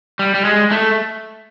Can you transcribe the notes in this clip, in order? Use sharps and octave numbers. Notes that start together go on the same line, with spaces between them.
G3
G3
G#3
A3